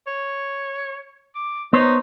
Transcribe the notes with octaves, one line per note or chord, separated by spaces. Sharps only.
C#5
D6
B3 D#4 C5 C#5